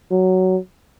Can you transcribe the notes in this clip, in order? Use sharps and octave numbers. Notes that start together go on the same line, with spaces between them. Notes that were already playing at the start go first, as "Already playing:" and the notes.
F#3